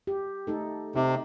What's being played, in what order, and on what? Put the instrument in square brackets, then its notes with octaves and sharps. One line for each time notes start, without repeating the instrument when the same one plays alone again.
[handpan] G4
A3 D#4 A4
[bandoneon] C3 [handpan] D#4